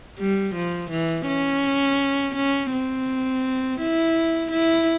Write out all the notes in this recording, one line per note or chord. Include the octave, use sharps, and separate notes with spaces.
G3
F3
E3
C#4
C#4
C4
E4
E4